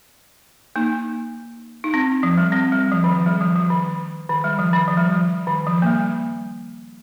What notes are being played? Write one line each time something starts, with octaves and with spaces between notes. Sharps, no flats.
A#3 D#4
D#4
C4
F3
G3
C4
G3
F3
D#3
F3
G3
F3
F3
D#3
D#3
G3
F3
D#3
F3
G3
F3
D#3
F3
A#3
G3